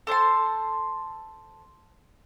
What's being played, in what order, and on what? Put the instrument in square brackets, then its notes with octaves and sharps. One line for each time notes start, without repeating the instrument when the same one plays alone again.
[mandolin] A4 C5 A5 C6